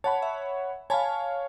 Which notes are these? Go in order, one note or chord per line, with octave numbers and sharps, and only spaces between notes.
C#5 F#5 A5 B5
E5
C#5 F5 G#5 A5 B5